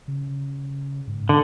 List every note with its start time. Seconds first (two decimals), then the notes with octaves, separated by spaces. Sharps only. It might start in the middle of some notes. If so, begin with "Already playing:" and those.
0.08 C#3
1.07 G#2
1.29 D3